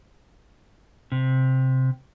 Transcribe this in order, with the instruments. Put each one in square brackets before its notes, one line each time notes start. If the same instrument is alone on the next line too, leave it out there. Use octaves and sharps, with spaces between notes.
[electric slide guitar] C3